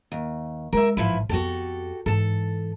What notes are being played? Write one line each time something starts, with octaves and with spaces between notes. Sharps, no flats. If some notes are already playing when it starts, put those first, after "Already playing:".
D#2
G#3 E4 A#4 E5
A1 G#2 F3 E4 B4
F2 B3 F#4 G4 A4
G#2 E3 A4 A5